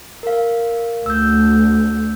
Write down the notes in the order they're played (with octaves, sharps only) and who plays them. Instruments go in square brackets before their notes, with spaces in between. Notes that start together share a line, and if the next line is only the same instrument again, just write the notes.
[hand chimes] A#4 F5
[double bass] D2 [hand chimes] E6 G6